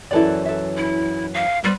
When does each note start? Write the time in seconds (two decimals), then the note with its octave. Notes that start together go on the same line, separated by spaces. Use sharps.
0.11 F#2 E3 F#3 E4 A4 D5
0.46 A4 E5
0.77 E4
1.34 F5
1.64 G3 B3 B4 C5